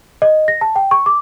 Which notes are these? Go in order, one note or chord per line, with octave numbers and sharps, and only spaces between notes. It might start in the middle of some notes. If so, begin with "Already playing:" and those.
D#5
A#6
A5
G5
C#6
D6